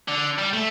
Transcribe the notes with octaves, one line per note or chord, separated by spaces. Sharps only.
D3
G3
A3